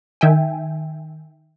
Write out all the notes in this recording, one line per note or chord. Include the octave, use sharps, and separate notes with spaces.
D#3 E5 G5 G#5